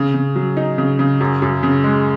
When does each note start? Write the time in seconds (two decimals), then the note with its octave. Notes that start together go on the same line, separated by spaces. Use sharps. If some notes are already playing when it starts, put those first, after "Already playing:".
Already playing: C#3
0.14 C#3
0.36 F#3
0.57 D#4
0.78 C#3
0.99 C#3
1.20 F#2
1.42 F#2
1.63 C#3
1.84 G#3